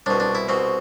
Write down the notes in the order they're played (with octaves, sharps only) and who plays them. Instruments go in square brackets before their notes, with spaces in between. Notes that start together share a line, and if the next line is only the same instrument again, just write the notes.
[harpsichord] C2 B2 D4
D4
E4
C2 B2 C4